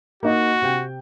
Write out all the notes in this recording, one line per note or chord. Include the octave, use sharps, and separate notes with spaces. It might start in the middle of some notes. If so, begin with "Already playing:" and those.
A#3 D#4 F#4 D#5
C3 G5